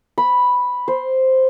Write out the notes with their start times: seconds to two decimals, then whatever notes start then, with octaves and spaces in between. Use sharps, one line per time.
0.18 B5
0.88 C5